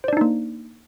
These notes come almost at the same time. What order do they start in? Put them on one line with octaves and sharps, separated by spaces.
C5 D5 D4 D#4 A#3